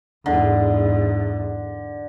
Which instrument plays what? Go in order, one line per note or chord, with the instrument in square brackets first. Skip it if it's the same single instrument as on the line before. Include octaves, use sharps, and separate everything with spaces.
[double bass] E2 G#2 [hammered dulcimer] D3